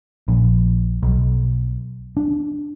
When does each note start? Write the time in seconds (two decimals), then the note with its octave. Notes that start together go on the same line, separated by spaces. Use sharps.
0.28 A#1
1.03 B1
2.17 D4